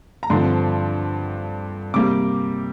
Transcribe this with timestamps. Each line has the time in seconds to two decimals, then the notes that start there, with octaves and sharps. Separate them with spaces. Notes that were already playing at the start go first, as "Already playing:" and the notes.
0.23 A#5
0.30 G2 D3 F3 C4 C6
1.94 C3 G3 A#3 D6